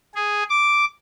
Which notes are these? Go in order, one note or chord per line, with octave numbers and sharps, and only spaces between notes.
G#4
D6